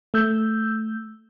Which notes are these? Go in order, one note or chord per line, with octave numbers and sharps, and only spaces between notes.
A3 E6 G6